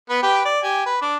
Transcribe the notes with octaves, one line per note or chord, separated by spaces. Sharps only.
B3 B4
G4 B4 G5
D5
G4 G#5
B4
D4 D6